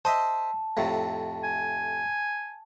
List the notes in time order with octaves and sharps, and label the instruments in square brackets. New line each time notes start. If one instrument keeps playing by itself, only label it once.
[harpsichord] C5 D#5 E5 [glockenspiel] A5
[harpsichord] F2 A2 C3
[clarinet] G#5